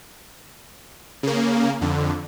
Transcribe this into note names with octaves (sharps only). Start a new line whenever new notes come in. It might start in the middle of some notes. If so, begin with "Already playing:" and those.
C#3 A#3
F2 D3